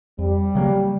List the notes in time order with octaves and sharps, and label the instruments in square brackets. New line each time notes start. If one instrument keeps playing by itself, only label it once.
[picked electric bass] F2 [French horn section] G3
[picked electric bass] C#3 F#3 A#3